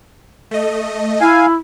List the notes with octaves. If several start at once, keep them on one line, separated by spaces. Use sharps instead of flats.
A3 D#5
E4 F5 G#5